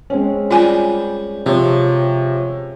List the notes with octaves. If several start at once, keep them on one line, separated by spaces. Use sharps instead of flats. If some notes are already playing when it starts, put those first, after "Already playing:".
G#3 C4 C#4
G3 F4 G#5
C3 F3 C#5